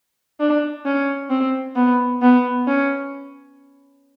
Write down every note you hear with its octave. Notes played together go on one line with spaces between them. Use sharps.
D4
C#4
C4
B3
B3
C#4